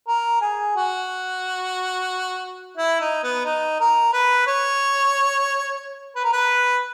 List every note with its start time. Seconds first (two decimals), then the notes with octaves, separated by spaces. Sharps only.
0.08 A#4
0.41 G#4
0.76 F#4
2.77 E4
3.00 D#4
3.23 B3
3.45 D#4
3.80 A#4
4.13 B4
4.47 C#5
6.16 B4
6.24 A#4
6.32 B4